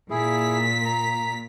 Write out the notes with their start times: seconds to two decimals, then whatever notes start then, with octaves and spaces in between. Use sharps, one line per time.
0.10 A#2 E4 G#4 B6
0.85 A#5